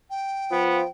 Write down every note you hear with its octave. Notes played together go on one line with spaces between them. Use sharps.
G5
F3 B3